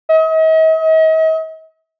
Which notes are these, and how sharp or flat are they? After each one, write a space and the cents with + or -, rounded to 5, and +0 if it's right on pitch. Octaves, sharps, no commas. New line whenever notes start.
D#5 +45